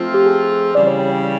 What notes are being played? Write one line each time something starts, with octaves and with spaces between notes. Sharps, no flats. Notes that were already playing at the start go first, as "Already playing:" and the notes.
Already playing: F3 A3 C4 F4
G4
G#4
C#3 E3 G3 D5
C#5
G5
G5